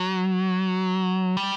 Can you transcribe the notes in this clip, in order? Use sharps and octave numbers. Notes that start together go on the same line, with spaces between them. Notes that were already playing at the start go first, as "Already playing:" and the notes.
Already playing: F#3
G3